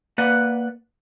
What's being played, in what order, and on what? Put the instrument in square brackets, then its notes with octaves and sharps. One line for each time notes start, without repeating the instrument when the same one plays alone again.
[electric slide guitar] A#3 B4 D5 F#5